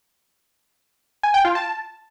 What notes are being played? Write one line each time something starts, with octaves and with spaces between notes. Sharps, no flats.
G#5
G5
F4
A5